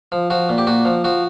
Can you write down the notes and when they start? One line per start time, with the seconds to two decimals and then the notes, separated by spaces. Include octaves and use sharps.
0.12 F3
0.30 F3 F#4
0.49 A#2
0.58 G4
0.67 A#2 F#4
0.85 F3
1.04 F3 F#4